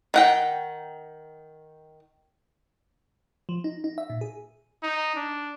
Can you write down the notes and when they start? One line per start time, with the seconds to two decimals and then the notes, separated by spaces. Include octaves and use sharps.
0.14 D#3 F#5 G5
3.49 F3
3.64 D#4
3.84 D#4
3.98 E5
4.10 A#2
4.21 G#4
4.83 D#4
5.16 D4